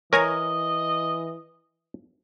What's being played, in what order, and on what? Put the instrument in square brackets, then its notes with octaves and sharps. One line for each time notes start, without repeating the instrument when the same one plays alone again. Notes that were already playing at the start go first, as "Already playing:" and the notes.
[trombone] E3 [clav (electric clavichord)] A#4 G#5 [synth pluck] C#5 A#5 [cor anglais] D#5